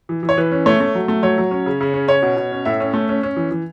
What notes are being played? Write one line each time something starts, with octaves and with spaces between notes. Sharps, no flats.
E3
E3
C#5
E3 B4
C#4
A3 C#5
A3
F#3
A3
F#3 C#5
F#3
C#4
C#3
C#3
C#4
C#4 C#5
B2
B2
C#4
A2 E5
C#4
A3
C#4
C#4
E3
E3